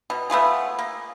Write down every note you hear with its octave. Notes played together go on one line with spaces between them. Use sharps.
B2
A3 B3 F4 G#4
A#3